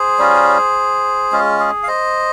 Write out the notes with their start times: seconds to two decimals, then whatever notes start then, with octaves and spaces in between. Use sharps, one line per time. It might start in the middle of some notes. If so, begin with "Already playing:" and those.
Already playing: G#4 C5
0.19 G3 C#4 F4
1.32 G#3 C#4 F4
1.60 G#4
1.83 F5
1.88 C5 D#5